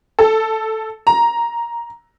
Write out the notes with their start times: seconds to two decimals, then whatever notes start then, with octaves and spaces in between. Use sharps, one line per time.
0.19 A4
1.07 A#5